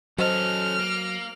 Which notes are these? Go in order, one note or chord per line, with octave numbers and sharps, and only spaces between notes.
F#3 C#4 F#4 A4 C5 D#5 F6
A#3